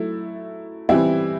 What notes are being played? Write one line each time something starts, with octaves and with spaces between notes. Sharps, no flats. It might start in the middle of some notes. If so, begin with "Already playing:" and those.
Already playing: F#3 A3 E4 A4
E3 G3 C4 E4